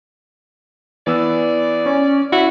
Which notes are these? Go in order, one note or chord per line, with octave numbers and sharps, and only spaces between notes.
E3 B3 D5 E6
C#4
E4 F#4 E5